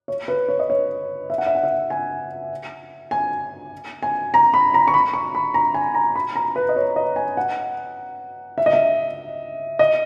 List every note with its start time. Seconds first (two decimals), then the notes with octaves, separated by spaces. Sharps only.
0.08 C#5
0.28 B4
0.48 C#5
0.59 D#5
0.70 C#5
1.30 E5
1.38 F#5
1.46 E5
1.55 F#5
1.63 E5
1.90 G#5
3.11 G#5
4.03 G#5
4.34 A#5
4.54 B5
4.74 A#5
4.88 C#6
4.94 B5
5.14 C#6
5.35 B5
5.54 A#5
5.74 G#5
5.94 A#5
6.16 B5
6.36 A#5
6.56 B4
6.69 D#5
6.76 C#5
6.96 D#5
7.16 G#5
7.37 F#5
8.58 E5
8.66 D#5
8.73 E5
9.79 D#5